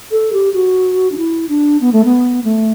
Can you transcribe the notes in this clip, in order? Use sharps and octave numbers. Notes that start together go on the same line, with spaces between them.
A4
G4
F#4
D4
E4
D4
B3
A3
B3
A3